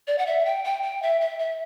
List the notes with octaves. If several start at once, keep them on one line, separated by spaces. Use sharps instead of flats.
D5
F#5
E5
G5
G5
G5
E5
E5
E5